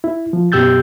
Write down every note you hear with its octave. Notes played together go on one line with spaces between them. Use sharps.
E4
F3
F#2 B2 G4 E6 G6 A6